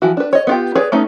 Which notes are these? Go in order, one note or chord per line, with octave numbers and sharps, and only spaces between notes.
E3 F3 F#4
D4 B4
C#5 D#5
B3 F4 G4
G#4 B4 C#5 D5
A3 B3 C#4 D#4